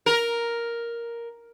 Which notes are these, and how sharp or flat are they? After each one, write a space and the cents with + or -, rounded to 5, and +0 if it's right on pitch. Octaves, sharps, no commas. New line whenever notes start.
A#4 +5